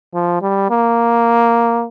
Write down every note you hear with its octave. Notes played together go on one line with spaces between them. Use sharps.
F3
G3
A#3